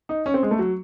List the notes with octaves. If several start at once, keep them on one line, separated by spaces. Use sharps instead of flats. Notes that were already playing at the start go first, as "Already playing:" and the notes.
D#4
C#4
C4
G#3
A3
F#3